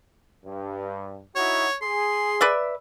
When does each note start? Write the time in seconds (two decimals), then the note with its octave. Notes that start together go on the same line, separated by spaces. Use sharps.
0.45 G2
1.35 D#4 E4 F#4 C#5
1.81 G#4 C6
2.41 B4 D5 E5